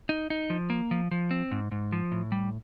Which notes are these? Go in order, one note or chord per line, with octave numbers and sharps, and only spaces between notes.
D#4
D#4
F3
A#3
F3
F3
C4
G#2
G#2
F3
A2
G3